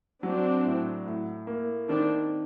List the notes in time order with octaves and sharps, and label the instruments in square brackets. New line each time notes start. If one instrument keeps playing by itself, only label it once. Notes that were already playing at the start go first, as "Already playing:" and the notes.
[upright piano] F#3 [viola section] C4 D4
[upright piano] A2
A2
A#3
[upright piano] D#3 [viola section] C4 D4